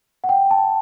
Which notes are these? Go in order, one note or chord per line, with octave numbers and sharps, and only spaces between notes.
F#5
G5
A5